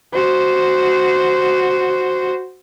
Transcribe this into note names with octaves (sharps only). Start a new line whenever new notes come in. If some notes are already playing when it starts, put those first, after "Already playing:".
F#4 C5